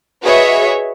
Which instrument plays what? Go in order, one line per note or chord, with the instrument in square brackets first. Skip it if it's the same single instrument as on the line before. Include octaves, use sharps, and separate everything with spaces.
[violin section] F#4 G#4 B4 C#5 D#5 E5